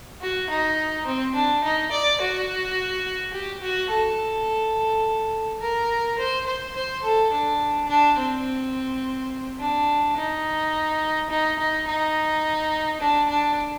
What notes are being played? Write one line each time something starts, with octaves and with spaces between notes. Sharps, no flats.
F#4
D#4
C4
D4
D#4
D5
F#4
G4
F#4
A4
A#4
C5
C5
C5
A4
D4
D4
C4
D4
D#4
D#4
D#4
D#4
D4
D4